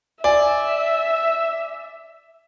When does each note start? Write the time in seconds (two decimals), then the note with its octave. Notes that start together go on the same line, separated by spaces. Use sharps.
0.24 D5 E5 G#5